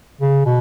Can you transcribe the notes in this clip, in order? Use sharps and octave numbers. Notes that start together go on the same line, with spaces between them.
C#3
B2